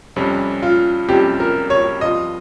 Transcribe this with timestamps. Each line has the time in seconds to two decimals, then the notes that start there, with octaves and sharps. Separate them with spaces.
0.16 F2 C3 G3 C#4
0.62 F4
1.08 F2 C3 G3 C#4 G4
1.40 A#4
1.70 C#5
2.01 G2 F3 C4 F4 D#5